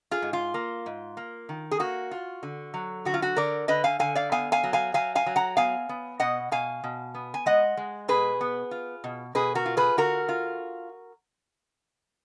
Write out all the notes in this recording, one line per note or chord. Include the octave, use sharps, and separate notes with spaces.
F4 G#4
G#2
F4
A#3
G#2
A#3
D#3
G#4
A#3 F#4
F4
D3
F#3
D3 F#4
F4
F#4
D3 A#4 D5
D3 B4 D#5
F5 G#5
D3 F5 G#5
D5 F5
B3 F5 G#5
F5 G#5
F#3
F5 G#5
F#3 F5 G#5
F5 G#5
F#3
F#5 A#5
B3 F5 G#5
B3
B2 D#5 F#5
B2 F5 G#5
B2
B3
G#5
G#3 D#5 F#5
G#3
B2 G#4 B4
B3
F4
B2
B2 G#4 B4
F#4 A#4
F4
G#4 B4
D3 F#4 A#4
F4